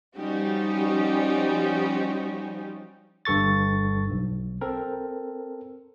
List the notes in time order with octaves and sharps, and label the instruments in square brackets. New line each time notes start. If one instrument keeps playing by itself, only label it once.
[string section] F3 G3 C#4 D#4 F#4 G4
[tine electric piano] G1 G2 A4 C#6 A6
B1
C4 A4 A#4